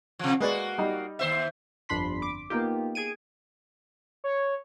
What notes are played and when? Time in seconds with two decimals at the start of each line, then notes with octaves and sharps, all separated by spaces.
0.19 C3 F3
0.40 G#3 A#3 F#4 B4 D5
0.78 G3 D#4
1.19 D#2 C5 E5
1.89 G1 F2 D4 B5 C6 B6
2.22 D6
2.50 A#3 B3 D#4 F4 G4
2.95 G#4 G#6 D7 D#7
4.24 C#5